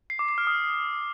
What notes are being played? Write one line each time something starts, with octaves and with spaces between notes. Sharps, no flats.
C7
D6
C7
F6
D#6